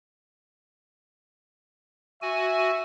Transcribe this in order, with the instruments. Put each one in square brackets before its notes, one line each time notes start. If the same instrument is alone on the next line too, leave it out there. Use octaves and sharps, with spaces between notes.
[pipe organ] F#4 G#5 [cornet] E5